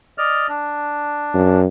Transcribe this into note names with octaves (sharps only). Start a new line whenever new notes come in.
D5 D#5 F6
D4
F#2